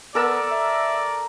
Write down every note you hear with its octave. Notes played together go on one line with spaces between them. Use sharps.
B3 A4 A#4 D5 E6
E5